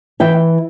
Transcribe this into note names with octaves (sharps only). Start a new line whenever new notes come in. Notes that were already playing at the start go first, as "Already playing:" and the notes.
E3 E5 G5